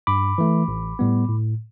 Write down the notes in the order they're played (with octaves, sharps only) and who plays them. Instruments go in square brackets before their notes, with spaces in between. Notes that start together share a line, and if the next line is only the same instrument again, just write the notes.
[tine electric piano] G2 B5 D6
E3 A3
A1
A2 G3 B3
A2